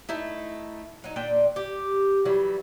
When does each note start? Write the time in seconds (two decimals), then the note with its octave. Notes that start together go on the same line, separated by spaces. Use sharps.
0.09 A3 D#4 E4
1.04 F#3 D#4
1.16 A#2 D4 G5
1.56 G4
2.25 E3 F#3 G3